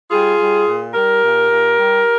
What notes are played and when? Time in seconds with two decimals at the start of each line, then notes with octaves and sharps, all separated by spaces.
0.11 G3 F4 G#4
0.39 G3
0.67 A#2
0.94 G3 G4 A#4
1.22 A#2
1.49 A#2
1.77 G3